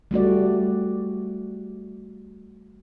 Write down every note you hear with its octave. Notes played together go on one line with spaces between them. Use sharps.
G3 A3 F#4 D5